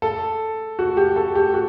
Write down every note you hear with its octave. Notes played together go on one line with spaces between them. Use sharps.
A4
F#4
G4
A4
G4
F#4